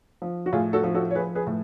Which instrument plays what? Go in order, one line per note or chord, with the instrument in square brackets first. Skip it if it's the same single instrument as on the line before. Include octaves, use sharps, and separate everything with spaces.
[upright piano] F3
F#4
A2 F4 G#4
F#4 A4
F3
F#4 A4
C#5
F3 G#4 B4
G#4 B4
A2